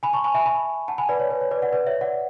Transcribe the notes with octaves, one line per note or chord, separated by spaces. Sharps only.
G#5 B5
A5 C#6
G#5 B5
E5 G#5
G#5 B5
F#5 A5
G#5 B5
B4 D5
C#5
B4
C#5
B4 D5
D5 F#5
B4 D5
C#5 E5
D5 F#5